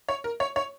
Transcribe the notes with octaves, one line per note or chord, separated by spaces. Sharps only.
C#5
A#4
C#5
C#5